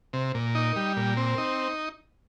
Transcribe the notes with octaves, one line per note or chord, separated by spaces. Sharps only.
C3
A#2
D#4
G3
A#2
C4
D#4